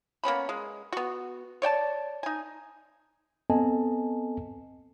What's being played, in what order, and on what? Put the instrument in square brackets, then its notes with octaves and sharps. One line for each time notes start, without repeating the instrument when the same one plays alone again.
[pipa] A#3 B3 C#4 B5
G#3
B3 F#4
C#5 D5 G5 A5
D#4 G#5
[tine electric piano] B3 C4 A4 D#5 G#5 A5